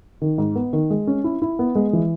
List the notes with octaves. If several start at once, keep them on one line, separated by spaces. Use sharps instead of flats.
D#3
G#2
B3
D#3
G#3
C#4
E4
E4
B3
G#3
E3